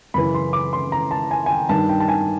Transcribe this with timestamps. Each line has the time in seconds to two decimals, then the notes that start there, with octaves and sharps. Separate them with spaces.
0.14 F#2 C#3 E3 B5
0.34 C6
0.53 D6
0.73 C6
0.92 A#5
1.11 A5
1.31 G#5
1.46 G#5
1.51 G5
1.69 G2 D#3 A5
1.89 G5
2.00 A5
2.08 G#5